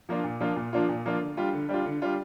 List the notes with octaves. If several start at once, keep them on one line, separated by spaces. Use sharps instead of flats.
F3 A#3 D4 F4
A#2
F3 A#3 D4 F4
A#2
F3 A#3 D4 F4
A#2
F3 A#3 D4 F4
D3
G3 D4 F4
D3
G3 D4 F4
D3
G3 D4 F4